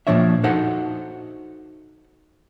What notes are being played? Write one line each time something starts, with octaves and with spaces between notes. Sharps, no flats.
A#2 D#3 F3 D4 C#5 E5
D#4 F#4 A4 C5 F#5